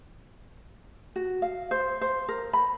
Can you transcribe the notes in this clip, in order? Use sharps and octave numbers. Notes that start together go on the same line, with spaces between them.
F#4
F5
C5
C5
A#4
B5